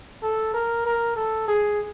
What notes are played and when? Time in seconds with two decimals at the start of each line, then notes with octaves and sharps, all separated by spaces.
0.22 A4
0.54 A#4
0.85 A#4
1.16 A4
1.48 G#4